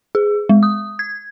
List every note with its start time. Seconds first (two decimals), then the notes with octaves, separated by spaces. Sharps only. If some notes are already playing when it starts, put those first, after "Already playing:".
0.15 G#4
0.49 G#3
0.63 D#6
0.99 G#6